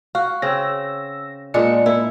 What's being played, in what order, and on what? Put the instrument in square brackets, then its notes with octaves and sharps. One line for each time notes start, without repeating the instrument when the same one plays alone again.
[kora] F#4 [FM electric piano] F5
[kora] C#3 C4 [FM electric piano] E6 A#6
[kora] A#2 G#3 D4 [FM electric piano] A#3 C#7
[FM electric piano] A#3 [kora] E4